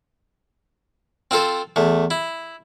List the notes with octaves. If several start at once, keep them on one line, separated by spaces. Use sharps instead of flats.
C4 F4 A4 C5
E2 A3
E4